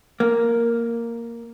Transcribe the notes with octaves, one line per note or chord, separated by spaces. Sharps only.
A#3